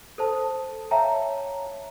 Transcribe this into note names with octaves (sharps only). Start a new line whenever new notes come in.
A4 C5 A5
C#5 E5 F5 G5 A5 A#5